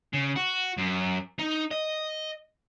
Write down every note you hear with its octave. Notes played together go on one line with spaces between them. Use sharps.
C#3
F#4
F#2
D#4
D#5